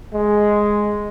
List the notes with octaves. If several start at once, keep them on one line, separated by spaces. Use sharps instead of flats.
G#3